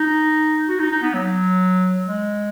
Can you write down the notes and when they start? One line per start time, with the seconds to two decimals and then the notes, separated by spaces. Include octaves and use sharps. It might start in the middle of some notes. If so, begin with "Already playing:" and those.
Already playing: D#4
0.68 F#4
0.80 D#4
0.91 D#4
1.02 B3
1.14 F#3
2.05 G#3